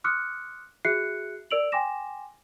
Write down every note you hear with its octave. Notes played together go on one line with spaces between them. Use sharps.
C6 D6 D#6 F6 F#6 C#7
F#4 G#4 E5 F#6 C7 C#7
A#4 D5 E6 D7 F7 F#7
G5 G#5 C6 D6 A#6 E7